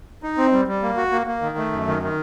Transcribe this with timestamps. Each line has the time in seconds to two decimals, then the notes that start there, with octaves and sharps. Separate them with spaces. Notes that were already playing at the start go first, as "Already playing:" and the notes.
0.23 D#4
0.38 C4
0.52 G3
0.67 G3
0.82 A#3
0.97 F#4
1.12 A#3
1.27 A#3
1.42 D#3
1.58 A3
1.72 F#2
1.87 D#3
2.02 D#3